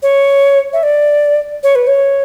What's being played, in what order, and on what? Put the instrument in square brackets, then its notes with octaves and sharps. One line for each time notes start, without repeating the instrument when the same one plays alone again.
[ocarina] C#5
E5
D5
C#5
B4
C#5